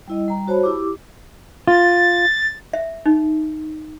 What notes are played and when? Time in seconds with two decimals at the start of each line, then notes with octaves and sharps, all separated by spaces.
0.08 G3 E4 D#5
0.28 G3 A#5
0.48 F#4 C5 C#5 A5 B5
0.63 E4 G4 D6
1.67 F4 A6
2.73 E5
3.06 D#4